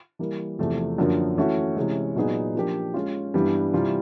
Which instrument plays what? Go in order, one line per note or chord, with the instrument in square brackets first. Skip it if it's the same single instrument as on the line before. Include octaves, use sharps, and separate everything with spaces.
[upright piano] E3 G3 A#3
E2 C3 F3 A3
F#2 D3 F3 A#3 D4
E3 A3 C#4 F#4
C3 E3 G#3 C#4
A#2 F#3 B3 D#4 G#4
F3 A#3 D4 G4
G#3 C#4 F4
G2 E3 G3 B3 D4
C3 E3 G3 C4 F4